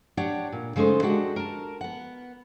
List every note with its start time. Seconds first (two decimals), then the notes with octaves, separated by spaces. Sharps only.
0.17 D4 G4 C#5 F#5
0.52 A#2
0.76 C#3 G#3 A3 D#4 C5
1.02 G#3 D4 F#4 G4 F#5
1.36 A#4 A5
1.81 B3 F#5